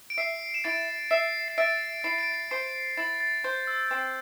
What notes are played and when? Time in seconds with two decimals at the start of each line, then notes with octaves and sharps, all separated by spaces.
0.10 D7
0.18 E5 C7
0.54 E7
0.64 E4 A6 D7
1.11 E5 C7 E7
1.48 C7
1.58 E5 A6 D7
2.04 E4 C7
2.19 D7
2.32 C7
2.51 C5 C7
2.97 E4 A6
3.21 A6
3.44 C5 G6
3.67 E6
3.91 C4